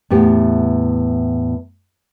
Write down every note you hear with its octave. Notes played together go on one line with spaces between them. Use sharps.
E2 A2 B3 G4